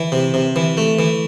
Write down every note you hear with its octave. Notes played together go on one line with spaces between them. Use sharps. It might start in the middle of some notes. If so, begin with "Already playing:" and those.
Already playing: E3
C3
C3
E3
A3
E3